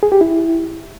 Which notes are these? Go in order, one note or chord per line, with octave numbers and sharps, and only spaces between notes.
G#4
G4
E4